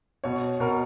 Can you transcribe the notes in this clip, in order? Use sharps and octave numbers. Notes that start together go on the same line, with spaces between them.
B2 C#5
B2 A#4